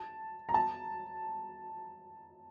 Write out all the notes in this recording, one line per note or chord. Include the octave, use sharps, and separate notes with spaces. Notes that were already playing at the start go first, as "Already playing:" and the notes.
Already playing: A5
A#5
A5